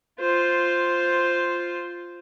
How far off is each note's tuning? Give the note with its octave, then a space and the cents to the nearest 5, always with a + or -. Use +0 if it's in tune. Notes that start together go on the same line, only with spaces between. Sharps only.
F4 +0 C5 +0